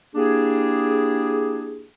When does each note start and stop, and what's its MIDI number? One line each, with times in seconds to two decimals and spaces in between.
0.15 1.86 58
0.15 1.86 62
0.15 1.86 64
0.15 1.86 67
0.15 1.86 68